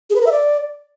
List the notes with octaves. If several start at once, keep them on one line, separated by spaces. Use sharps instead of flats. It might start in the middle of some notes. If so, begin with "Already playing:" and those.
G#4
B4
A#4
E5
D5